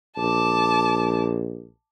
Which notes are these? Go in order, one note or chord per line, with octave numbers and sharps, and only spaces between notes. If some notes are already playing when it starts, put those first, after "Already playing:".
A#1 A5 D6